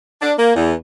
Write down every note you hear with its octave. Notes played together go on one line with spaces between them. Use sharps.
D4
A#3
E2